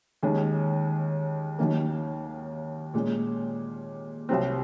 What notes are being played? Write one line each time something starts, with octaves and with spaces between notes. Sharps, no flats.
D#2 D#3 G#3 C#4
D#2 D#3 F#3 A#3 C#4
A#2 G#3 C#4
C2 C3 F#3 C4